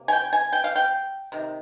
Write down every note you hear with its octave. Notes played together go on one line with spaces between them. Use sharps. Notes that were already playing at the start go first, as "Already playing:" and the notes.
Already playing: C3 A#3
G#5
G5
G#5
G5
F5
G5
C3 D#3